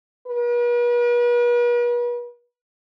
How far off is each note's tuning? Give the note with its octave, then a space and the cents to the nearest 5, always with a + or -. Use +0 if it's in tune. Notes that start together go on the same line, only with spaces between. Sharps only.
B4 -45